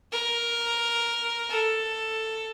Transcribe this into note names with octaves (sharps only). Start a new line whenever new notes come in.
A#4
A4